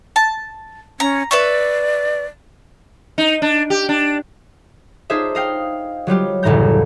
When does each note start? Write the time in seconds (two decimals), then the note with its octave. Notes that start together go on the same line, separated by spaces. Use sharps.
0.16 A5
1.00 C#4 A#5
1.31 B4 D5 E5 C#6
3.18 D#4
3.42 D4
3.70 G4
3.89 D4
5.10 D4 D#4 F4 G#4 C5 E5
5.35 D#5 F5 G5
6.07 F#3 G3 F4 G4
6.43 F#1 D2 A2 E3 A#5 G6